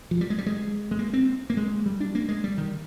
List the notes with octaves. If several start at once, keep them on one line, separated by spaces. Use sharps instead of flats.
F3
G3
G#3
G3
G#3
G#3
A#3
C4
A#3
G#3
G3
D4
A#3
G#3
G3
D#3